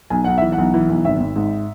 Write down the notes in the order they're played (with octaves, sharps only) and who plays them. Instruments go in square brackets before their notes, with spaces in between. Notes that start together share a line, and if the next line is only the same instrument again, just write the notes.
[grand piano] B1 G#5
B1 F#5
E3 E5
F#5
B1
E3
B1
G#1 E5
G#1
G#2